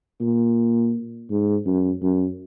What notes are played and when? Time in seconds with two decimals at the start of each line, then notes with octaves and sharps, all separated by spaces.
0.21 A#2
1.31 G#2
1.67 F#2
2.02 F#2